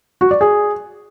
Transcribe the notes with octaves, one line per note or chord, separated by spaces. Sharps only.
F#4
D5
G#4